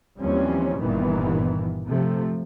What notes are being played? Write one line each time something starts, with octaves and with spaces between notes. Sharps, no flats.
D#2 E3 F3 G3 C4 C#4
G1 G2 A#2 D#3 E3 B3
C3 F3 A3